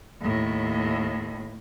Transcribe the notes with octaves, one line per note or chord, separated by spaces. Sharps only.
D#2 A2